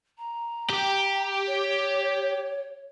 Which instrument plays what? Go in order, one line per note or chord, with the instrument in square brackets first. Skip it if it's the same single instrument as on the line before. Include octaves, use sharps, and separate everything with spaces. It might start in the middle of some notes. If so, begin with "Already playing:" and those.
[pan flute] A#5
[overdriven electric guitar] G4
[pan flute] C#5